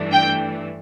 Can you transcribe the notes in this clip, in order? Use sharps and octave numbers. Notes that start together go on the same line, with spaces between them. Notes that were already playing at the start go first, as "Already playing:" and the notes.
Already playing: G2 E3 A3 D4
G5